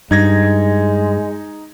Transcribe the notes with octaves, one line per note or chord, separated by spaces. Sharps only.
G2 G#3 D#4 G#6 A#6